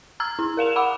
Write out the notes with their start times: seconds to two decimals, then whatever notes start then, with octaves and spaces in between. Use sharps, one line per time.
0.20 A#5 E6 F6 G#6
0.39 E4
0.57 A#4 F5 E7 F7
0.76 F#5 B5 D6 E6